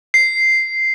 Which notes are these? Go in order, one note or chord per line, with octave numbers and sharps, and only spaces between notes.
C7